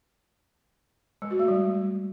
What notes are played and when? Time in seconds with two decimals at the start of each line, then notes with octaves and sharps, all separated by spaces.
1.22 G#3
1.31 F#4
1.39 A3
1.48 G3